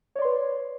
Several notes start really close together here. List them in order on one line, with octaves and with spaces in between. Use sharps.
C#5 D5 C6 B4